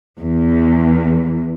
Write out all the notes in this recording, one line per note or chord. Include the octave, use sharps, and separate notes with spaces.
E2